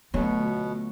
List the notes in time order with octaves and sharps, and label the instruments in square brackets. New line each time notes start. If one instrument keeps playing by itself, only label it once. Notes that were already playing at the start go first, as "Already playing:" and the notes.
[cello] D2 [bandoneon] B2 [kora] F#3 A3 [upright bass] B3 F4